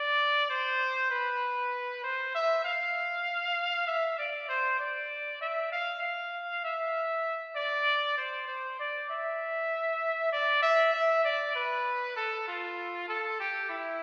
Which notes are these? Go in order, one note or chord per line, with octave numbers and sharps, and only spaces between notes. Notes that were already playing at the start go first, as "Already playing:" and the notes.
Already playing: D5
C5
B4
C5
E5
F5
E5
D5
C5
D5
E5
F5
F5
E5
D5
C5
C5
D5
E5
D5
E5
E5
D5
B4
A4
F4
A4
G4
E4